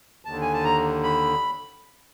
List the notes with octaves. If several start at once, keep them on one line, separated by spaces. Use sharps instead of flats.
D#2 D3 A5
G#5
A5
A#5
B5